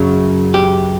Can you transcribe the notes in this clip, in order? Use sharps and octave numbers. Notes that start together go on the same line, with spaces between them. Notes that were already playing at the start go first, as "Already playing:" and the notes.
Already playing: F#2 C#3 F#3
G4